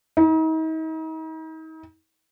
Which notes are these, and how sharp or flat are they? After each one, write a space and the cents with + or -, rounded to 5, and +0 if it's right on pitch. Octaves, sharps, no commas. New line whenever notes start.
D#4 +40